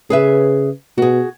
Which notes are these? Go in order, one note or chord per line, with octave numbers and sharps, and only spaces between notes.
C#3 G#4 B4 E5
B2 F#4 G#4